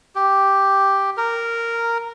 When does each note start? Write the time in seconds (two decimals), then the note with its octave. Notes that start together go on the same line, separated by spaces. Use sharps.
0.15 G4
1.17 A#4